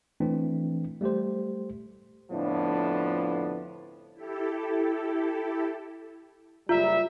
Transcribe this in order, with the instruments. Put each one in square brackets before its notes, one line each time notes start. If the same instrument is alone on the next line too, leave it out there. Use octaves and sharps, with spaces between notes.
[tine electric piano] E3 A3 C4 D4
G3 A3 G4 C5
[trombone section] F2 A2 D3 F3 B3 D4
[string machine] E4 G4 A4
[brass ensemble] F#1 G3 E5 [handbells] F4